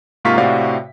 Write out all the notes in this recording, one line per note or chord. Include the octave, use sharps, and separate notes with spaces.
G#2 C3 A#3 F4 C#6 B6
A2 C3 F#4 D5 F5